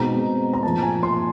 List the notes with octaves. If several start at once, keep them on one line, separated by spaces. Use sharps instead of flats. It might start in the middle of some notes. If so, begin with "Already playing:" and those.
Already playing: B2 G#3 C4 D#4 A#5
A#5
A#2 F3 A#3 A5
G#5
C6